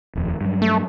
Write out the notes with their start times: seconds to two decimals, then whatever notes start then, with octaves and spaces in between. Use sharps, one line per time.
0.15 D#1 F2
0.41 G2 F#3
0.62 A3